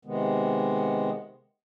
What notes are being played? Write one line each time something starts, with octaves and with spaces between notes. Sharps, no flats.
C3 D#3 G#3 B3